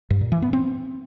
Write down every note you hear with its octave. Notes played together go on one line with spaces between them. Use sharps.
G2
A#2
E3
B3
C4